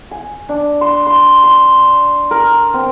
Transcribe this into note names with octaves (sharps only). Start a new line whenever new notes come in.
G#5
D4
C6
C6
C6
A#4
C4